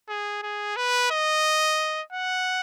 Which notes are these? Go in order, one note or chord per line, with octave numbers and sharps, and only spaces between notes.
G#4
G#4
B4
D#5
F#5